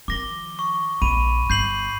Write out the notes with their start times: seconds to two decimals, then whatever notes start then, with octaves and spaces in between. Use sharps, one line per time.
0.08 D#3 F3 D6 A#6 G7
0.59 C#6
1.02 A#1 B5 D#7
1.50 G1 G6 C7 F#7